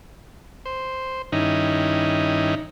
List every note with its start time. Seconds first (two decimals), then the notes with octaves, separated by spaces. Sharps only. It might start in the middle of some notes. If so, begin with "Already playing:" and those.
0.66 C5
1.32 G2 D#3 C#4 D#4 E4